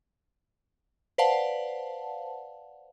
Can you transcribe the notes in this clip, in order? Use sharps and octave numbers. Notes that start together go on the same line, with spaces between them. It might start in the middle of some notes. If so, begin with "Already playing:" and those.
B4 C5 D5 F5 F#5 A5